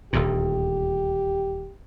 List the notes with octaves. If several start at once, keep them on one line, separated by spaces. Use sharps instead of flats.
D#1 D2 A#2 G4